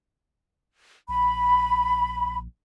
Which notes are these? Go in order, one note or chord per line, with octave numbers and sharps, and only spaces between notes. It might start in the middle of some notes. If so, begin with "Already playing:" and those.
A#1 B5